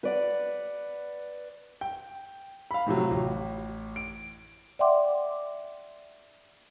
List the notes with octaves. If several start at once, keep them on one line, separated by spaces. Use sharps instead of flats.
B4 D5 F#5
G5
F5 B5
A2 C3 F3 F#3
A1
D7
D5 E5 F#5 G5 C6 D6